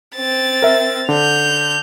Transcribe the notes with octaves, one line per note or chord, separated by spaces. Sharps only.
C4 A6
A#4 E5
D3 G6 F7